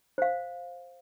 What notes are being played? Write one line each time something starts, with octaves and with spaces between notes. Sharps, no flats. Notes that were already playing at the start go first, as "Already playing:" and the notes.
C5 F5